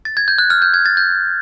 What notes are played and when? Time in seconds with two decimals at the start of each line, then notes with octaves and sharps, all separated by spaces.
0.05 A6
0.17 G#6
0.28 G6
0.38 F#6
0.50 F6
0.62 G6
0.74 G#6
0.86 A6
0.97 G6